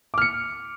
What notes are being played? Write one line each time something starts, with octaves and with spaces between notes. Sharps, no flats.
D6 F6 C#7